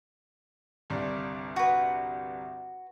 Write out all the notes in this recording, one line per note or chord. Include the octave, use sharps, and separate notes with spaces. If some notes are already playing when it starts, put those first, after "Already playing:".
G1 C2 D4
F#4 B4